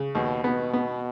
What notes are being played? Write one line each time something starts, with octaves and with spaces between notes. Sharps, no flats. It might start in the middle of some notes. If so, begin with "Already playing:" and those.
Already playing: C#3
D#2 B2
B2 B3
B3